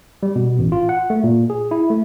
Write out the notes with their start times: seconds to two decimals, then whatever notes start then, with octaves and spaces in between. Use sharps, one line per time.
0.23 G3
0.36 B2
0.59 A1
0.72 F4
0.89 F#5
1.10 A3
1.24 A#2
1.50 G#4
1.71 E4
1.90 A3